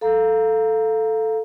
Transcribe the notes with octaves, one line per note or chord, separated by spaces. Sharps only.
A4 F5 A#5